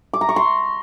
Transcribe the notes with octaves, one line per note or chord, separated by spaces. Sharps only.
D6
A#5
C#6
C6